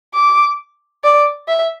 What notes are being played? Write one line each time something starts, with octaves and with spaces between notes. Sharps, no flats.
D6
D5
E5